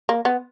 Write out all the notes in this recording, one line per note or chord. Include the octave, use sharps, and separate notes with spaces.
A#3
B3